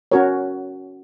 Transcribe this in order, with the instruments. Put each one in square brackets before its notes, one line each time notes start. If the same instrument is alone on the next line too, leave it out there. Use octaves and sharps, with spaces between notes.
[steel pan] C#4 F#4 A#4 C#5